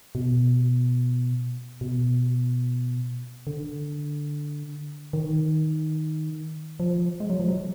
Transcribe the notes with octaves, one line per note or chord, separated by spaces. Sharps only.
B2
B2
D3
D#3
F3
G#3
F#3
F3
F#3